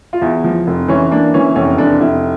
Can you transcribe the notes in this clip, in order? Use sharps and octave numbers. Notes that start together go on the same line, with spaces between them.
F4
E2 E4
F3
F1
E3 C#4
A#3 D4
E3 C#4
F1 C#4
F1 D4
F1 E4